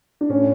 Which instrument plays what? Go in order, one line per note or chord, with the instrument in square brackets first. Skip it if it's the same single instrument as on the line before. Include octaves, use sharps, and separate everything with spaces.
[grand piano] D4
[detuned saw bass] A2 [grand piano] C#4